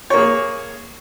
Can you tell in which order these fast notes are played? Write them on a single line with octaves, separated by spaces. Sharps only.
C#5 A#3 G#4